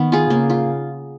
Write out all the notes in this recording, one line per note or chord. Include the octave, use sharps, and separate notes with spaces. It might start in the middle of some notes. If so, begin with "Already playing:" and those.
Already playing: D#3 B3 D#4
F4 G#4
C#3 A#3
F4